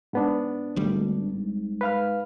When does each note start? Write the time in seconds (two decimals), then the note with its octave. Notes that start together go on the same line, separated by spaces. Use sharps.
0.13 G#2 B3 D4
0.76 G#1 D2 G3
1.33 G#2
1.81 B4 F5 F6